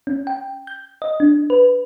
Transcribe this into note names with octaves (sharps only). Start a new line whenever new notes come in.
C#4
G5
G6
D#5
D4
B4